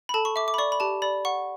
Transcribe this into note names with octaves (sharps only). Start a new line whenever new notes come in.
B5
A4 A5
C#6
E5 D6
D6
B5
D5 C#6
B5
G4 A5
D5 B5
F#5 C#6